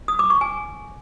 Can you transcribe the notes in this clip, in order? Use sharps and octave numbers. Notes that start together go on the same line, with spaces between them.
D#6
D6
C#6
G#5